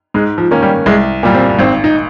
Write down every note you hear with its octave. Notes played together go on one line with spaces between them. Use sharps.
G#2 G#3
F3
D#3 A#3 C#4
G3
C2 G#3
A#2 G3
C4
G#1 C4
D#4